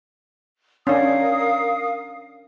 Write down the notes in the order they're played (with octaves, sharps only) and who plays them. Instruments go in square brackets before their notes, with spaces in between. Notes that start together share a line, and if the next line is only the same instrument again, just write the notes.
[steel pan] C#4 D4 [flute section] A#4 F5 D#6